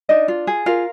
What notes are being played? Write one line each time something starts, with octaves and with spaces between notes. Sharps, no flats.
D4 D#4 D#5
F4
G#4
F4 A#4 F5